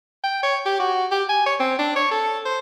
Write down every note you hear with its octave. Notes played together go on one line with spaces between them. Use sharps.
G5
C#5
G4
F#4
G4
G#5
C#5
C4
D4
C#5
A4
C5